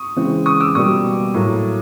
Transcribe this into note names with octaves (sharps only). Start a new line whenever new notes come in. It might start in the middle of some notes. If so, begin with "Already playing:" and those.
Already playing: C#6 D#6
C#3 E3 G#3 C4
C#6 D#6
D6 E6
B2 G3 A#3 C#6 D#6
A2 F#3 A#3